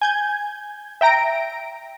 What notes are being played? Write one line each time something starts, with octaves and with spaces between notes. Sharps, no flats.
G#5 G6 G#6
E5 G5 A#5 A#6 D7